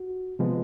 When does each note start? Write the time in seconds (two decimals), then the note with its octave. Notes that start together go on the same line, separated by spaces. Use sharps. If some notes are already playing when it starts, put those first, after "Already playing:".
Already playing: F#4
0.39 C3 F3 G#3 B3